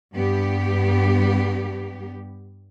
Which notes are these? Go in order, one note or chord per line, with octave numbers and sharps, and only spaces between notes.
G2 B3 G4